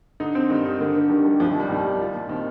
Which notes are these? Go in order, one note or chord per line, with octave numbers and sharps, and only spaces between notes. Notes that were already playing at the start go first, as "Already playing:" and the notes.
D3 D#4
C4
G2 D#3
D#4
D3 A#3
A#3
D#3 G3
G3
C2 F3
D#3
F3 G3
C2 D#3
C2
F4
A#2
D#3 C4